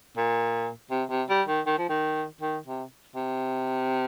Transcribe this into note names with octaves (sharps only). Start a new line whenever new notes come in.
A#2
C3
C3
G3
D#3
D#3
F3
D#3
D#3
C3
C3